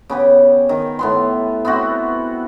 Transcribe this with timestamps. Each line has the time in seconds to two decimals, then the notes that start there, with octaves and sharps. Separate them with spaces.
0.10 C#3 B3 G4
0.69 D#3
0.99 A2 B3 C6
1.65 B3 C4 E4 F#4